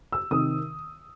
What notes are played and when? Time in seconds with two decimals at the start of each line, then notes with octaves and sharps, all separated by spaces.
0.12 E6
0.31 C3 D#3 D#6